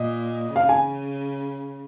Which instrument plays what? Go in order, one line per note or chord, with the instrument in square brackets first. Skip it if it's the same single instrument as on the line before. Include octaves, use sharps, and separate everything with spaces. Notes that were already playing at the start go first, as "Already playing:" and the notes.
Already playing: [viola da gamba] A#2 [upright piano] D#5
[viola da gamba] C#3 [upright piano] F5
[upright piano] G#5